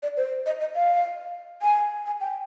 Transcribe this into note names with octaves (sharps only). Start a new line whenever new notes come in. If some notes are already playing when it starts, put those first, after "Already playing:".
D5
C5
D#5
D#5
F5
G#5
G#5
G5